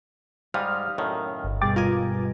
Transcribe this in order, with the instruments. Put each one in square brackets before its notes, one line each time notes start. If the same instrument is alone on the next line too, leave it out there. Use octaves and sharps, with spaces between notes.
[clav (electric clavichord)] G#2 G3 G#3 [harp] F5 D#6 A#6 [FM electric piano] F6
[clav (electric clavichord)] F#2 A2 D#3
[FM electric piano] G1
[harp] G2 B2 G#4 [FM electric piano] G5 D6 A6
[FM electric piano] F4 [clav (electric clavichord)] A#4 D#5 G#5